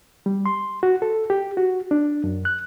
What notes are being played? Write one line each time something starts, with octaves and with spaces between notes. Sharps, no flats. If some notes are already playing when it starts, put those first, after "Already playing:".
G3
C6
F#4
A4
G4
F#4
D4
F#2
F#6